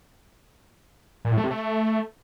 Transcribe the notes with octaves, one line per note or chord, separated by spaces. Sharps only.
A#2
A2
A3
C3
A3